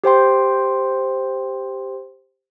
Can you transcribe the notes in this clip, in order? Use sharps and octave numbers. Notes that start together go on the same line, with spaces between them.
G4 C5 G5 C6